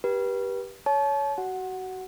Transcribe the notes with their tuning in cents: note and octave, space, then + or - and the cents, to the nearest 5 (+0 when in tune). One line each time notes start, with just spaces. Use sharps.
G4 +0 B4 -30
C#5 +15 A5 -35
F#4 +25 F#5 +0